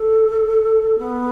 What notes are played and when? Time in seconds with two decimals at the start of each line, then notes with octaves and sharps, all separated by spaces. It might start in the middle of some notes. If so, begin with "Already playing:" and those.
Already playing: A4
0.98 B3